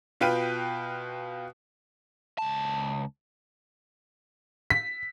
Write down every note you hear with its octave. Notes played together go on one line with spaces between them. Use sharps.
B2 F4 B4 G5 F6 D#7
C#2 A5
B6